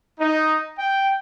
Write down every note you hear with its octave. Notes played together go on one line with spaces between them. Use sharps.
D#4
G5